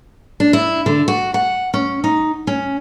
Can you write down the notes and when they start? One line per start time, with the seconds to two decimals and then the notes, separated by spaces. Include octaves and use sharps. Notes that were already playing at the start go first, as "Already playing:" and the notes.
0.40 D4
0.53 E4
0.86 D3
1.08 F#4
1.34 F#5
1.74 C#4
2.04 D#4
2.47 C#4